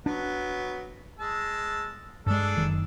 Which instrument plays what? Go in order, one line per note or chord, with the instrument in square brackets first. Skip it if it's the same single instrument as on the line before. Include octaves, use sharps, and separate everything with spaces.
[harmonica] F#3 B3 [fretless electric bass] D4
[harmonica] G#3 A5 E6
[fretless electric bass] G2 G#3 [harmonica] D4 G#4 A4
[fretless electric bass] F#1 D#3